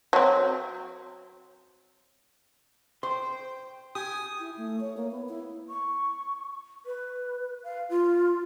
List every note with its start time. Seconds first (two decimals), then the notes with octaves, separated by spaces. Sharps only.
0.13 F#3 C4
3.03 C5 G5 C6
3.95 G4 G#5 D#6
4.40 E4
4.57 A3
4.80 C#5
4.97 A#3
5.11 B3
5.29 E4
5.69 C#6
6.86 B4
7.64 F5
7.90 F4